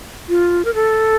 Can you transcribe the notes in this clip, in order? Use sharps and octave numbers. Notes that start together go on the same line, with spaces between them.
F4
A#4
A4